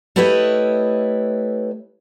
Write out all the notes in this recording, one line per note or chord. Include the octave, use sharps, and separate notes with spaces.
A3 E4 G4 B4 C#5 D#5